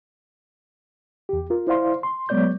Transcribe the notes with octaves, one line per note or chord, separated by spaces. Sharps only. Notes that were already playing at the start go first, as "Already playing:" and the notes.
E2 G4
F4 A#4
E4 C5 D5 F5 C6
C6
F#3 G#3 B3 C#5 D5 G6